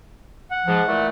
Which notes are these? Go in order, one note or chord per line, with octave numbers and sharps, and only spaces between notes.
F#5
G#2 F3
A#2 E3 A3